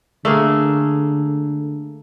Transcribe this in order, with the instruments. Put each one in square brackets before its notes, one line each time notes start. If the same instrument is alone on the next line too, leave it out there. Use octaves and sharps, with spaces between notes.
[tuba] D3 [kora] A3 A#3 G#4